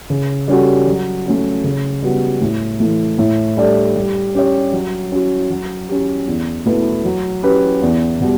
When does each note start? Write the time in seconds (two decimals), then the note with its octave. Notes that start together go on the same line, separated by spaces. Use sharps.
0.10 C#3
0.48 G3 C#4 F#4 A4
0.87 F#3
1.26 A3 C#4 F#4
1.64 C#3
2.02 G3 B3 F#4
2.41 A2
2.80 E3 A3
3.19 A2
3.57 G3 D4 A4 D5
3.96 G3
4.35 C#4 G4 C#5
4.73 F#3
5.12 C#4 F#4
5.50 F#3
5.89 C#4 G4
6.27 E2
6.66 B2 A3 E4 B4
7.04 F#3
7.43 C#4 G4 B4
7.82 E2
8.20 B2 G3